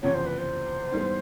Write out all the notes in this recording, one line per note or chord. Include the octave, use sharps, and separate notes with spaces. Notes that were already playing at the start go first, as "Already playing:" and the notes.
F#1 E2 C3 F3 C#5
C5
B4
C5
G#2 E3 G3 B3